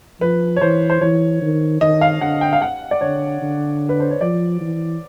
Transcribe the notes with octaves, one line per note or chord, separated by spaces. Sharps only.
F3 B4
C#5
E3 C5
C5
E3 C#5
D#3
D#3 D#5
F5
D3 F#5
G5
F5
F#5
D5
D3 C#5
D3
B4
C5
C#5
F3 D5
E3